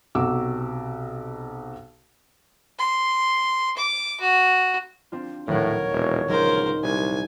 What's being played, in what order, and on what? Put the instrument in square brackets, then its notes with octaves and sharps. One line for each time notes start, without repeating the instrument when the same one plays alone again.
[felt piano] B1 C3 F#4 F#5 D6 E6
[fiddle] C6
D6
F#4
[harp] C4 D4 F4
[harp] D#1 F#3 F#5 [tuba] A2 [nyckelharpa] A#4 [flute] C#5
[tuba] E1
[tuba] C#2 [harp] F#3 D#4 [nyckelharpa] A#4 C5
[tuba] C2 [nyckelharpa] G#5